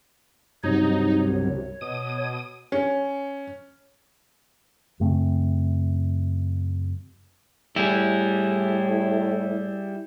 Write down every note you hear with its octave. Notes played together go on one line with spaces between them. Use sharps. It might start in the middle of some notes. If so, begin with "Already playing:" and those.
G2 C3 F#3 D#4 C#5
C2
B2 D#6
C#4
F#2 C#3 A3 C4
A2 G3 E4 G#4